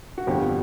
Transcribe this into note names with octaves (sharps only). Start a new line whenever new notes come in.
F#4
G1 F2 D3 G4